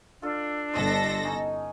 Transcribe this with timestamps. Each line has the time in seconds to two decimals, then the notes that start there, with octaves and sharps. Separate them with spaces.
0.22 D4 F4 A4
0.74 G1 A4 C5 D#5 F#5 A#6
1.25 C#4 D#4 A#5